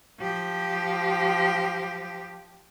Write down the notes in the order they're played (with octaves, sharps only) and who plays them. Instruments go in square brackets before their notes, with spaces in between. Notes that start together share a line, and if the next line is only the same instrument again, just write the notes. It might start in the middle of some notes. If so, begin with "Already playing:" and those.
[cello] F3 G4